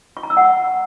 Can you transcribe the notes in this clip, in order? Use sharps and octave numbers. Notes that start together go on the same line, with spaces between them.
C#6
A#5
E6
F#5